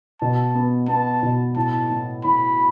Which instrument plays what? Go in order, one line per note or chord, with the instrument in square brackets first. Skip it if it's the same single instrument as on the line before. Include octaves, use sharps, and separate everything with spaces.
[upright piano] B2 [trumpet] A5
[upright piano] B3
[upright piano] B3 [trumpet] A5
[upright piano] B2
[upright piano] A2 [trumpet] A5
[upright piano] A2
[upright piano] A2 [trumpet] B5